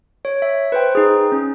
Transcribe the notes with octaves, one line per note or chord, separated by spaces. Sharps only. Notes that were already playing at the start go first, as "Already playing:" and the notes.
C#5
E5
B4 C5 G5
D#4 G#4
C#4